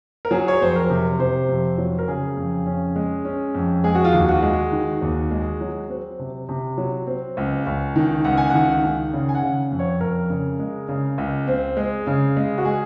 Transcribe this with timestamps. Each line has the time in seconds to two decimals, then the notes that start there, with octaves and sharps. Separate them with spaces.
0.25 A#4
0.31 F#3 G#4
0.48 C#5
0.61 F2 C5
0.76 A#4
0.90 C3
1.19 C3 C5
1.49 F2
1.78 F#3
1.99 A#4
2.08 C#3 G#4
2.37 F2
2.66 C#4
2.96 G#3
3.25 C#4
3.55 F2
3.84 G#3 G#4
3.95 F#4
4.05 F4
4.13 D#2 F#4
4.29 F#4
4.42 G#3
4.72 D#3
5.02 D#2
5.31 G#3
5.61 F#3
5.90 C4
6.19 C3
6.49 C3
6.78 F#3
7.07 C4
7.37 C#2
7.67 C#2
7.96 D#3
8.24 C#2 F#5
8.37 G#5
8.50 D#3 F#5
8.84 D#3
9.13 C#3
9.29 G#5
9.35 F#5
9.43 C#3
9.72 F2
9.79 C#5
10.01 F2 A#4
10.30 C#3
10.59 G#3
10.89 C#3
11.18 C#2
11.47 C4
11.77 G#3
12.07 C#3
12.37 G#3
12.58 F#4
12.65 G#3 G#4